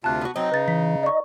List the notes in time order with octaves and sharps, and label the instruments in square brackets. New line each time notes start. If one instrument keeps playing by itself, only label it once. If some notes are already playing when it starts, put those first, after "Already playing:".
[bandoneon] D2 C3 F4 [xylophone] A5 F#6
[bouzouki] B3 F#4
[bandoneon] F#3 C4 [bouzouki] D#4
[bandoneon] C#3 [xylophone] B4 A6
[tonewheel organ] E3 [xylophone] B6
[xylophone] D5 C#6 [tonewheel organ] D#5